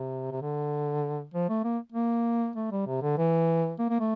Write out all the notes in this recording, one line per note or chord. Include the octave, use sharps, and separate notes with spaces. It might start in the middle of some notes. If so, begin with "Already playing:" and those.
Already playing: C3
C3
D3
F3
A3
A#3
A#3
A3
G3
C3
D3
E3
A#3
A#3
A3